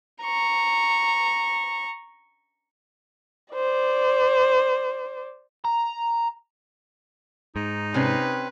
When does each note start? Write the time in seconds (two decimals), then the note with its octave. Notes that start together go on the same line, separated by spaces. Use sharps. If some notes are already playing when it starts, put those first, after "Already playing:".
0.22 A#5 C#6
3.54 C5 D5
5.65 A#5
7.56 G#2 D#4
7.94 C3 C4 C#4 B4